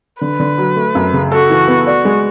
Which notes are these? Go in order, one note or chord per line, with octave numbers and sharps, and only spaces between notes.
D3 B4
D3
F#3
A3
F#2
C#3
F#4 A4
E3
B3
F#4 D5
G#3